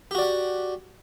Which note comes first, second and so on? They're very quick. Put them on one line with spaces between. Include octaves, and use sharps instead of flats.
G4 F#4 D5 F#5